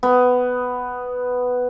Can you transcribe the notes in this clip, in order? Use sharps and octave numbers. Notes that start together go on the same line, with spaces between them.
B3